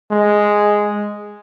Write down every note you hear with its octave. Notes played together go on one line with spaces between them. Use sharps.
G#3